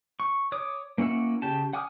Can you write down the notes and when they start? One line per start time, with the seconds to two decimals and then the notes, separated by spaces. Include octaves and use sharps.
0.20 C#6
0.52 C#5 D6 D#6
0.98 A#3 C#4 E4 F#5 E6
1.42 C#3 G4 A5
1.73 F#5 G#5 D6 D#6 F6